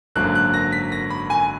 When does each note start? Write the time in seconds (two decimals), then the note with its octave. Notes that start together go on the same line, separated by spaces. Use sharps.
0.15 G#1 F#2 D3 F#3 A#3 F#6
0.35 F#6
0.54 A#6
0.72 B6
0.92 A#6
1.10 B5
1.30 G#5